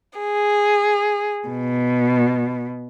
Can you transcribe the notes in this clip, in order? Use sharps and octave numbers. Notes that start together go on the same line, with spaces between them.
G#4
B2